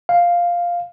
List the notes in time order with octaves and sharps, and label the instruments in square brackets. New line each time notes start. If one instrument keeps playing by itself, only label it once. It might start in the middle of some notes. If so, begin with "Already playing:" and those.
[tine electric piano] F5